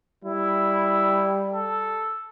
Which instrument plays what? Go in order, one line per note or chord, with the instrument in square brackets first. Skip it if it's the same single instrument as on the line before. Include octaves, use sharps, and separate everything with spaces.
[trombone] G3 [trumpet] E4
[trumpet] A4